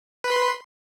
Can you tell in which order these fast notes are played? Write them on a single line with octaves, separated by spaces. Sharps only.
B4 B5 C6